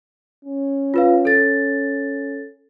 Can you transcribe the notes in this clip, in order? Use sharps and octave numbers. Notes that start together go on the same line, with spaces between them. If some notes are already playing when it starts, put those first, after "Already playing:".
C#4
F4 B4 F5
A4 A6